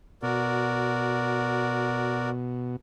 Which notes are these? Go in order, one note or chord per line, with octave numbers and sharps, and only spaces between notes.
B2 F#4 A#4 D5